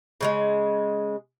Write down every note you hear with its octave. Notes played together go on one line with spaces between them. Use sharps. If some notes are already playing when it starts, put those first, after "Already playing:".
C#3 G3 G#3